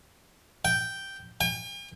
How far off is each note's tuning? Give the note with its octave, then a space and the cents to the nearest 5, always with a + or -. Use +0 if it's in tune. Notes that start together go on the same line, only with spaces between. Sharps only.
G5 -5
G5 +45